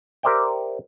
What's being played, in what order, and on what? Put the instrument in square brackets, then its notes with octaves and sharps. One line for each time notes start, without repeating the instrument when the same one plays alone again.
[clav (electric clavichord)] G4 A#4 C5 D5 E5 G5